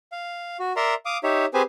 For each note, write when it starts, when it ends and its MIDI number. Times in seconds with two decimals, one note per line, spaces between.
0.12 0.57 77
0.60 0.73 66
0.76 0.94 70
0.76 0.94 74
0.76 0.94 76
0.76 0.94 82
0.76 0.94 84
1.06 1.18 77
1.06 1.18 86
1.06 1.18 87
1.23 1.45 63
1.23 1.45 67
1.23 1.45 73
1.23 1.45 76
1.54 1.62 60
1.54 1.62 67
1.54 1.62 68
1.54 1.62 71
1.54 1.62 72
1.54 1.62 80